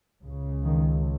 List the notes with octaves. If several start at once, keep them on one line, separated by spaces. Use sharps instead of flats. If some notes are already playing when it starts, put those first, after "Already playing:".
C#2 C#3
D#3